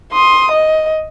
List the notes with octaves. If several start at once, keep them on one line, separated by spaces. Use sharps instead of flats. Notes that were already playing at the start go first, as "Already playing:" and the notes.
C6 D#6
D#5